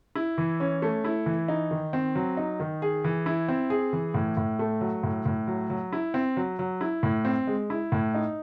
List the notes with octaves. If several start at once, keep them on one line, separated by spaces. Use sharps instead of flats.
E4
E3
C#4
A3
E4
E3
D#4
D#3
C4
F#3
D#4
D#3
G#4
E3
E4
C4
G#4
E3
A2
A2
A3
F#3
A2
A2
F#3
F#3
E4
C4
F#3
F#3
E4
A2
C4
G#3
E4
A2
D#4